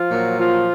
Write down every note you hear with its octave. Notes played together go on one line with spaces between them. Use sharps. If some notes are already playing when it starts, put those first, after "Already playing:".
Already playing: F3 F4
A#2 F#3
F3 F4